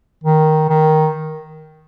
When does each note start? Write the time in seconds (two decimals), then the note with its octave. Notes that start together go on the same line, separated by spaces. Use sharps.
0.24 D#3
0.70 D#3